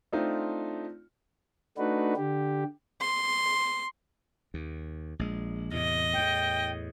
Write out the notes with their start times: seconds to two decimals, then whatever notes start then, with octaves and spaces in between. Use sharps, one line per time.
0.13 A3 C4 D4 D#4 F4
1.78 A3 D4 D#4 F#4 B4
2.16 D3 G4
3.01 C6
4.54 D#2
5.19 A#1 G#3
5.73 E2 A2 C3 D#5
6.13 E2 A2 G5